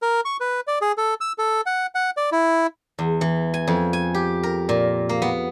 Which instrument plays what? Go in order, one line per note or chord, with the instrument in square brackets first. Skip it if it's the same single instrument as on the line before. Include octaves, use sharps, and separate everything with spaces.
[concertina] A#4
C#6
B4
D5
G#4
A4
E6
A4
F#5
F#5
D5
E4
[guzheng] E2
E3
G#5
F2
G#5
G4
A#4
A#2
A#3
B3